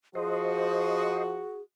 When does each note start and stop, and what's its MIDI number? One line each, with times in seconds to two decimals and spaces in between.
0.15 1.41 53
0.15 1.60 66
0.15 1.61 68
0.15 1.24 72
0.15 1.24 75